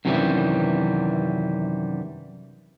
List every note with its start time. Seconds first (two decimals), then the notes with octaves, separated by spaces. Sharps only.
0.05 F#2 C3 D#3 E3 G3